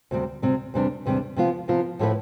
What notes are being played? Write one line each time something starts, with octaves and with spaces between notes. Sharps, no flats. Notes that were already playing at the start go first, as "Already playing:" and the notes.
D2 C3 G3 C4
D2 C3 G3 C4
E2 C3 G3 D4
E2 C3 G3 D4
C3 F3 B3 F4
C3 F3 B3 F4
A2 F3 A3 E4 B4